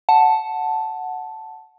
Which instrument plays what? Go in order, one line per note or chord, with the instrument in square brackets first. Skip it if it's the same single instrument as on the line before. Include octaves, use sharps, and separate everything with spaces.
[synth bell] F#5 A5